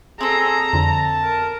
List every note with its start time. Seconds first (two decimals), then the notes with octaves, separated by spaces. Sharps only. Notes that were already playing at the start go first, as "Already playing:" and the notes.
0.21 C4 G#4 A4 A#5
0.73 F2 D3 A5
1.24 A#4